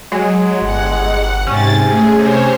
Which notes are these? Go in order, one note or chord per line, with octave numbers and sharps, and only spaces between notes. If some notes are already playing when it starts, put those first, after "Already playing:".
F#3 G#3
G1 F#5
G#2 C3 C#4 A6
A3 G#4
C3 C5 C#5